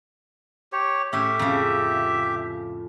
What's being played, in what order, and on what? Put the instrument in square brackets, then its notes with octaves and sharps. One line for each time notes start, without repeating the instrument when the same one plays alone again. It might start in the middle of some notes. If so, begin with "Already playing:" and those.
[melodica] G4 C#5
[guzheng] A2 C#4 [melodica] G4 E5
[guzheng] F2 C#3